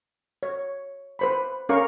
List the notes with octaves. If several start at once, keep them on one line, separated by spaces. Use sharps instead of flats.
C#5
B4 C5 B5
C#4 A#4 F5 C#6